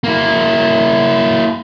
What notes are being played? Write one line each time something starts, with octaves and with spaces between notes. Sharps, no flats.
A#3 E4